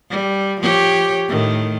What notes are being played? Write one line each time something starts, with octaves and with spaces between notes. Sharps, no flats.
G3
F3 G4 C#5
A2 D#3